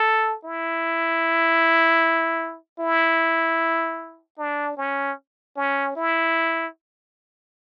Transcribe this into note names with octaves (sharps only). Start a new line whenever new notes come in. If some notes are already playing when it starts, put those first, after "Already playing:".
Already playing: A4
E4
E4
D4
C#4
C#4
E4